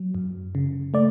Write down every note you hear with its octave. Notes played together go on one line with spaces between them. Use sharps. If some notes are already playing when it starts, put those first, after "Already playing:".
Already playing: F#3
F#2
C#3
A3 D5